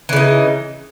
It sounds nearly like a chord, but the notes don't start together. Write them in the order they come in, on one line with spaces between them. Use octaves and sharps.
E3 C#3 D#4